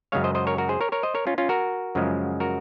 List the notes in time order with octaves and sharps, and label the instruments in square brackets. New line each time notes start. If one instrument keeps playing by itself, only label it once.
[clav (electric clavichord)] F#2 C#3 G#3 C#5 F5
C5 D#5
C5 D#5
A#4 C#5
F#4 A#4
G#4 C5
A#4 C#5
A#4 C#5
C5 D#5
A#4 C#5
C#4 F4
C#4 F4
F#4 A#4
F#2 C#3 F3 G#3
F#4 A#4